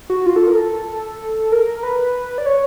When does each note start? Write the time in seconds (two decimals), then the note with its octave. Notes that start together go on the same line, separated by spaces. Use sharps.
0.10 F#4
0.26 F4
0.36 A4
0.47 A#4
0.57 A4
1.52 A#4
1.83 B4
2.38 D5
2.46 C#5